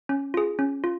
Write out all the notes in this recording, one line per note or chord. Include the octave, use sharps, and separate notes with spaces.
C#4
F4 G#4
C#4
F4